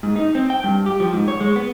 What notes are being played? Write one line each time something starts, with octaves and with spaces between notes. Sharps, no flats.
G#2
D#4
C4
G5
G2
G4
F3
G#2
C#5
G#3
B3